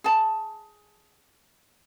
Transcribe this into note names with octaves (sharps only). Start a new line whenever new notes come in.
G#4 A5